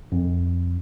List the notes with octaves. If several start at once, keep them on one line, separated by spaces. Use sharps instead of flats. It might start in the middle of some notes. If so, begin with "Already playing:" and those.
F2